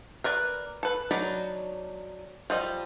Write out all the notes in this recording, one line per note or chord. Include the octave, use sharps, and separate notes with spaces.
A#4 B4 D5
A4 B4
F#3 D4 D#4 D5 B5
F3 G3 D#5